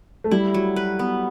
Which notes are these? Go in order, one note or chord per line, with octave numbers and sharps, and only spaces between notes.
A3
G3 E4
F#3
B4
B3